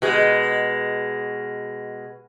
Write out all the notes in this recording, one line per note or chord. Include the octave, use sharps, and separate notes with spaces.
B2 G#3